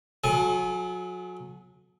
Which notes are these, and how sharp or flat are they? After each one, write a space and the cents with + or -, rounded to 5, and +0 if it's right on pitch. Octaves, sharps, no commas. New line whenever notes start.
F#3 -30 A4 -40 G#5 +0